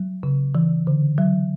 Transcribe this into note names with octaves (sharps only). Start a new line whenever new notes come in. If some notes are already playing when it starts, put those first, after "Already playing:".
Already playing: F#3
C#3
E3
D3
F#3